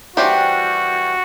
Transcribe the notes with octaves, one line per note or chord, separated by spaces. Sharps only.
E3 G3 D4 F#4 G4 C5